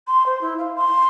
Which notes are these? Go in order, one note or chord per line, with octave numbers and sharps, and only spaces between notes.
C6
C5
E4
F5
C6